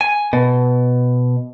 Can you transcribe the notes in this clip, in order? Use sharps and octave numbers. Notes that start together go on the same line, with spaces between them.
G#5
B2